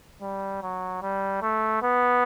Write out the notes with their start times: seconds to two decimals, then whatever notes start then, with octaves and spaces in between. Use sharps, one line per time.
0.22 G3
0.62 F#3
1.02 G3
1.42 A3
1.82 B3